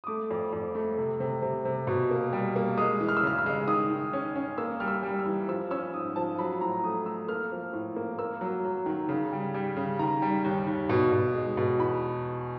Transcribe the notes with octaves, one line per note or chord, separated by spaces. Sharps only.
D#6
A3 D6
F2
F2
A3
C3
C3
C3
C3
B2
A#3
G3
A#3
G#3 D#6
E3
F6
E6
C#3 F6
E6
G#3
D#3 D#6
D#3
C#4
C#4
A#3 E6
G3 F6
E6
G3
E6
E3
F3 E6
C#4 E6
G#2 D#6
F3 A5
F#3 B5
A2 A#5
A3 D#6
A3 E6
A#3 F6
F3
A2
A#3
A#3 E6
F#3
F#3
D#3
C#3
G3
G3
C#3
D#3 A#5
G3
D#2
D#2
B2
B2
G#3
B2
E2 B5